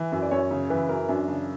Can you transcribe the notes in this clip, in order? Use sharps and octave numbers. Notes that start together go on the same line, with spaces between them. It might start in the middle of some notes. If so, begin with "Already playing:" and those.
Already playing: E3
F#2
D5
F#2 C#5
C#3
E3 B4
F#2 A#4
F#2 D4
C#3 D4